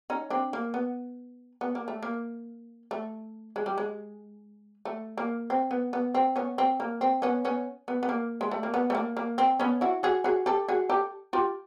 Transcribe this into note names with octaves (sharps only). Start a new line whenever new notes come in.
C#4 D#4
C4 D4
A#3
B3
B3
A#3
A3
A#3
A3
G#3
G3
G#3
A3
A#3
C4
B3
B3
C4
B3 C#4
C4
A#3
C4
B3 C#4
B3 C#4
B3
B3
A#3
G#3
A3
A#3
B3
A3
A#3
A#3
C4
B3 C#4
E4 F#4
F#4 G#4
F#4 G#4
G4 A4
F#4 G#4
G4 A4
F4 G4